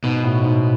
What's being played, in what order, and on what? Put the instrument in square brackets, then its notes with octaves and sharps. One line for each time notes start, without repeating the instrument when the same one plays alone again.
[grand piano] G#2 [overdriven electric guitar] B2
[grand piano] A2
G#2